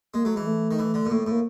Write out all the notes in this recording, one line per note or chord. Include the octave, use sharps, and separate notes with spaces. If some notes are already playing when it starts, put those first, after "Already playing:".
G#3 A#3
F#3 A3
E3 G#3
A3
D#3
E3
D3
A#2
A2 A3
A3
A2 A#3